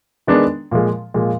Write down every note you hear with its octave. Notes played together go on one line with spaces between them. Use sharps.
D#3 G#3 B3 D4
A#2 F3 G#3
A#2 F3 G#3